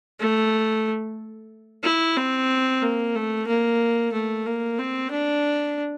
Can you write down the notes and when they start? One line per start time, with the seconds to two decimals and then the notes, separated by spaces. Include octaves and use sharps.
0.20 A3
1.83 E4
2.17 C4
2.82 A#3
3.15 A3
3.47 A#3
4.13 A3
4.46 A#3
4.78 C4
5.11 D4